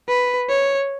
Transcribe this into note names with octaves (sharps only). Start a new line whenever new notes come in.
B4
C#5